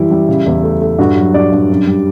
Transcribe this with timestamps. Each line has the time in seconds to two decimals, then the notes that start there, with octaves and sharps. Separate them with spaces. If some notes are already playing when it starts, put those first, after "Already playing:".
Already playing: F#2 E3 G3 E4
0.11 G3
0.29 C#3
0.46 E2
0.63 A3
0.81 A3
0.98 G2 F#4
1.16 F#3
1.34 G2 D5
1.52 G2
1.70 F#2
1.87 G3